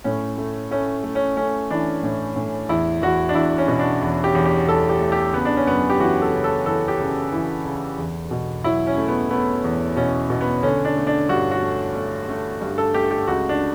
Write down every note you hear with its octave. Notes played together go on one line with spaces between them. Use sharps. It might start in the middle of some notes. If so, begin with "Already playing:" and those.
A2 C#4
A3
A3 C#4
A3
C#4
A3 C#4
E3 D4
A2
A2
E2 E4
E2 F#4
D4
E2 E4
C#4
B2
D4
E2
G4
E2
G4
E2 A4
G4
A3
G4
C#3 B3
D4
C#4
F#2 B3
G4
E3 F#4
A4
C#3
A4
E3 A4
G4
C#3
E3
C#3
E2
B2
F#3 E4
C#4
A3
B3
A3 B3
E2
B2 C#4
B2
B3
D3 C#4
D4
A3
D4
G2 F#4
F#4
A3
A3
A3
G2
A4
A3 G4
G4
C#2 F#4
D4